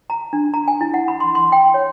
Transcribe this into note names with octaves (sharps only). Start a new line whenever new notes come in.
A#5
D4
A#5
G#5
E4
F#5
B5
C6
C6
G5
C#5